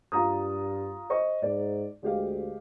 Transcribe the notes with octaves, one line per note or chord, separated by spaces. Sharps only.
G2 F4 A#5 D#6
C5 D#5 C#6
G#2 D5
D2 G#3 G4 F5